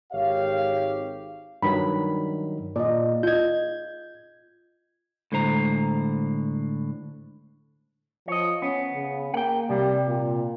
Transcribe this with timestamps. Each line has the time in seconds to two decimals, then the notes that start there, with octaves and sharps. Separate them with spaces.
0.13 G#1 G4 C#5 F5
1.63 G2 D#3 F#3 B5
2.76 A#2 D5 D#5
3.23 F4 D#5 G6 G#6
5.32 A2 D3 G#3 C5 A#5
8.28 F3 C#5 D#5
8.62 B3 C#4
8.94 C#3
9.34 A#3 F#5 G5
9.69 C3 G3
10.07 A#2